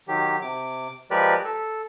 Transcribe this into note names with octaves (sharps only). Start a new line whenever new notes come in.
D#3 F#3 G4
C3 D6
F3 G#3 G4 A#4 B4 D5
A4